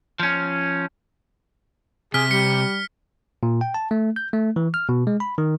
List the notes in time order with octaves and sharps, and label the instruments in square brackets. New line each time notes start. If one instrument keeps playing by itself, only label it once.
[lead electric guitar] F3 C#4
[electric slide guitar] C3 [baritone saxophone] G#4 [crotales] F6 B6
[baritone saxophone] G3 [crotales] C#7
[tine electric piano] A#2
G5
A5
A3
G6
A3
E3
F6
B2
G#3
B5
D#3